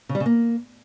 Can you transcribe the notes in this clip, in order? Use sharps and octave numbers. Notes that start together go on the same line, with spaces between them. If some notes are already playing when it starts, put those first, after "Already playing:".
C#3
G3
C#3
A#3